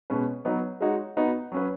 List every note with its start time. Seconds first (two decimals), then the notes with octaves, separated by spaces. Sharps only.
0.10 B2 G#3 C#4 B4
0.45 F#3 B3 D#4 B4
0.81 G#3 D#4 F#4 C#5
1.17 B3 D#4 F#4 B4
1.52 F#3 C#4 B4